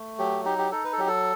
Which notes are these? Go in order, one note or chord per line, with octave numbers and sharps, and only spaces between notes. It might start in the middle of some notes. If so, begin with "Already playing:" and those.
Already playing: A3
F#3 G4
D#4 G4
G4
D#4 A4
B4
A4
F#3 G4
A4